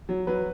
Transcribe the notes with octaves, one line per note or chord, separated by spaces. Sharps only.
F#3
F#3 B4